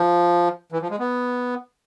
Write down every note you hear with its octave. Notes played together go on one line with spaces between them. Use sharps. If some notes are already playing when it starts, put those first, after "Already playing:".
Already playing: F3
E3
F3
G#3
B3